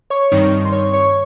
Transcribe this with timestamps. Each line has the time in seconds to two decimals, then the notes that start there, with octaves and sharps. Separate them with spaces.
0.10 C#5 C#6
0.32 G2 D#3 G3 C4 D#4
0.65 C6
0.72 C#5 C#6
0.93 C#5 C#6